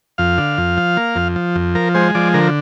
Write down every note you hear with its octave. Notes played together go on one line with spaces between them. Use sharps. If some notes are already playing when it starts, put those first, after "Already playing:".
F2 F5
D3
F2
F3
A#3
F2
F3
F2
F3 A#4
G#3 C5
F3 D5
D3 A#4